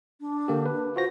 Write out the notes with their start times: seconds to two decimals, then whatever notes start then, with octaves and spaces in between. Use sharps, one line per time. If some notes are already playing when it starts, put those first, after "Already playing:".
0.21 D4
0.48 D3 A#3 G4
0.66 B4
0.96 F4 F#4 C5 A#6